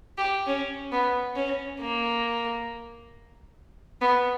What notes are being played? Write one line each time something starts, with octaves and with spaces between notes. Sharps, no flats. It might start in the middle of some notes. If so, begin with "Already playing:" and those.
G4
C#4
B3
C#4
A#3
B3